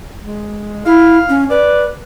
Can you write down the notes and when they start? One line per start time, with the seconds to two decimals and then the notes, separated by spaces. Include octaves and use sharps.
0.24 G#3
0.86 E4 F5
1.29 C#4
1.50 B4 D5